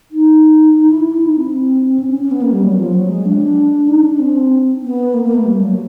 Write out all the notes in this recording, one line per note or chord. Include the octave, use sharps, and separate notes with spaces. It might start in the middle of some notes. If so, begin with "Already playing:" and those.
D#4
D#4
E4
E4
D#4
C4
C#4
C#4
C#4
B3
A#3
G3
F#3
F3
F#3
G#3
D4
D#4
D4
C4
B3
A#3
A#3
A3
G3
F#3